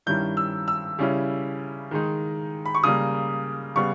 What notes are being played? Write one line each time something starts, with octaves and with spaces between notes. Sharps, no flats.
G2 D#3 G3 C#4 E4 G6
E6
E6
C#3 G3 C#4 E4
D#3 G#3 D#4
B5
C#6
C#3 G3 A#3 D#6
C#3 G3 B3 C#6